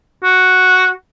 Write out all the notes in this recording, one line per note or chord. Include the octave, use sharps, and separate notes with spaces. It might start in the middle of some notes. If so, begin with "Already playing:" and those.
F#4